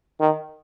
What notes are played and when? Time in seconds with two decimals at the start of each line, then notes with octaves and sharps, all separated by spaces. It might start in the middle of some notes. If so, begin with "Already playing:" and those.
0.21 D#3